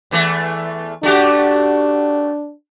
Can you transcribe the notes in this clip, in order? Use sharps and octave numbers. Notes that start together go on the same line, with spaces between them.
E2 E3 A3
A3 D4 F#4 G4